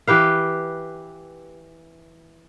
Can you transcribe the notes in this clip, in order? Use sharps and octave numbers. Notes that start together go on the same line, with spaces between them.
E3 G4 B4 F5